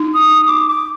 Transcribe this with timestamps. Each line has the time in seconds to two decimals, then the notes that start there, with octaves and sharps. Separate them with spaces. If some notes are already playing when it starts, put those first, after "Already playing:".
Already playing: D#4
0.14 D#6
0.41 D#6
0.47 D6
0.68 D6